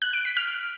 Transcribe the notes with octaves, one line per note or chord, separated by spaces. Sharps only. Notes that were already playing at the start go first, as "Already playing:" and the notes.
F#6
D7
B6
F6